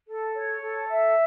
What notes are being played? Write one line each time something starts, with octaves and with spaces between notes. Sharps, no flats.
A4
C#5
A4
E5